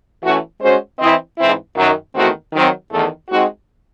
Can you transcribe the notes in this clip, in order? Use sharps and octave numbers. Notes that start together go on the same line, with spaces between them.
E3 A3 C#4 F#4
G#3 C#4 F#4 C5
E3 C4 E4 C5 D#5
G#2 E3 C4 E4
F#2 D#3 F#3
E2 D#3 A3 C4 F#4
D#3 F#3 C4
E2 D#3 A3
G#3 C4 D#4 F#4